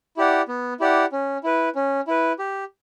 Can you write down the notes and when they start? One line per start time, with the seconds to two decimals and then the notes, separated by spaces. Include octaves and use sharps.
0.17 E4 G4 D5 F#5
0.48 B3
0.80 E4 G4 D5 F#5
1.12 C#4
1.44 E4 B4
1.75 C#4
2.07 E4 B4
2.39 G4